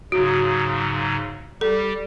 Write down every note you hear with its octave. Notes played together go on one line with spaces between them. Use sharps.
G#2 C#3 F#3 F#4
G3 G4 A4